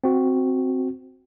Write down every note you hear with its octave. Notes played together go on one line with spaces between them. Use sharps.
C4 F#4